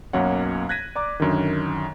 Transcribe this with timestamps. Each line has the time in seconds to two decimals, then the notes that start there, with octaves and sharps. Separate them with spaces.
0.13 B1 F#2 A#3 C#4 C#5 F#5
0.69 F#6 G#6 A#6 B6 D#7
0.96 D5 A#5 D6
1.20 F#2 D3 D#3